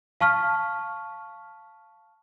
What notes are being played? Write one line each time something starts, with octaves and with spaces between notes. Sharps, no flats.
F5 A5 C#6 F6 B6